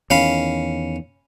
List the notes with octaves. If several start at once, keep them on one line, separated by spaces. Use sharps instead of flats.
E2 D#3 C#4 F5 B5